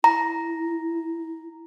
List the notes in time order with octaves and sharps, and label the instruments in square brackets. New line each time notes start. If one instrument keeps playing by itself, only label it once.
[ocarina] E4 [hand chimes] A#5